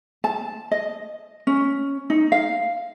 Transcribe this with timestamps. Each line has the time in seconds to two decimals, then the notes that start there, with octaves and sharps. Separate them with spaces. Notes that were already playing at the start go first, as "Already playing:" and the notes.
0.24 A5
0.71 D#5
1.47 C#4
2.10 D#4
2.32 F5